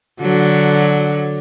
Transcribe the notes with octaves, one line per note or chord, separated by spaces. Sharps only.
D3 F#3